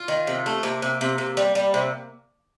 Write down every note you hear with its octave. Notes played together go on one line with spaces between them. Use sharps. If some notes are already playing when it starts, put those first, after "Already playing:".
Already playing: F4
D#3
C3
A3
C3 A#3
C3
C3
C3
G3
G3
C3